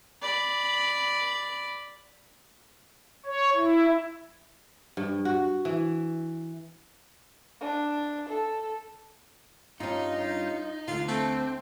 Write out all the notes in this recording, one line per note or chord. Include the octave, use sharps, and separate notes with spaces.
D5 B5
C#5
E4
G2
F#4
E3
D4
A4
G2 C#4 D#4 F4
D2 D3 F4
A3 C4